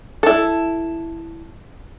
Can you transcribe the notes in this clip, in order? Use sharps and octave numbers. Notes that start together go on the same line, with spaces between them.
E4 A4